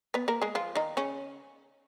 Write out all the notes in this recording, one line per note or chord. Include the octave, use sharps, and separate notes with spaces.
B3 B4
A#3 A#4
G#3 G#4
F3 F4
D#3 D#4
C#3 C#4